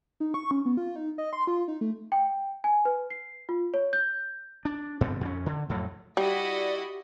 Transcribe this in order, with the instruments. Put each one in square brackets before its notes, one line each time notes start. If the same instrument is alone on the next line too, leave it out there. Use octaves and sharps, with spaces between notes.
[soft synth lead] D#4
C#6
C#4
B3
F4
D#4
D#5
C6
F4
D#4
A3
[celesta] G5
G#5
B4
C7
F4
C#5
G6
[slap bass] D4
G2 B2 D3 C4
F2 B3 C#4
D3
F2 A2 F#3
[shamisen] G3 [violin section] E4 F#4 D#5 [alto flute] G4 [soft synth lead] D5